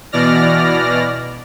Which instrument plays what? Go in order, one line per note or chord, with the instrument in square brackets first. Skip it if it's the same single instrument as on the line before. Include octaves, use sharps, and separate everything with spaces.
[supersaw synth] B2 E3 D5 F6 A#6